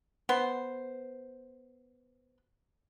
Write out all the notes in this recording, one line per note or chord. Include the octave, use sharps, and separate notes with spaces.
B3 C5